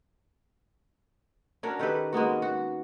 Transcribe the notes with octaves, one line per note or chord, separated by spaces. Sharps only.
C#4 D4 F#4 A#4
D#3 G4 A4 B4
G#3 A#3 B3 F#4
F#4